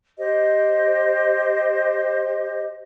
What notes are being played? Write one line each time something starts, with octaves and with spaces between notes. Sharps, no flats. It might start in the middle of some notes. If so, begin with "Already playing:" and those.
G4 C5 D#5